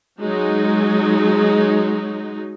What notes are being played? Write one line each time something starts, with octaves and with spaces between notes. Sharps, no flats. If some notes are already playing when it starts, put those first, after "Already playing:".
F#3 G#3 D#4